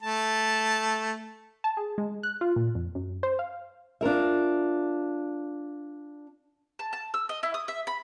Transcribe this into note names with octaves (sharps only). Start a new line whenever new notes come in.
A3 A5
A5
G#4
G#3
F#6
F4
A#2
F2
F#2
C5
F5
D4 F4 A#4 E5
A5
A5
E6
D#5
E4
D#6
E5
B5